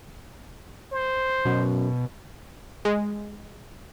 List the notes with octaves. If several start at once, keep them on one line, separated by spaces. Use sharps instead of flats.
C5
F#2 B2
G#3